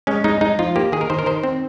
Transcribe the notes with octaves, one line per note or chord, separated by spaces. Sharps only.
G#3 C#4
G#3 D#4
G#3 D#4
F3 F4
A#3 G4
D#3 G#4
A#4
D#3 C5
A#4
D#3 C5
C4